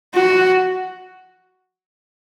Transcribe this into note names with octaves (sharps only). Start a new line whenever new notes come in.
F#4